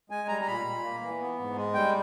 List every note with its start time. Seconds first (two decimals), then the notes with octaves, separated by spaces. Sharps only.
0.10 G#3 G#5
0.28 G3 A#5
0.42 A#5
0.47 A#2 B5
0.65 A#2
0.83 A#3
1.01 E3
1.20 B3
1.39 G#2
1.56 G#3
1.74 G3 G5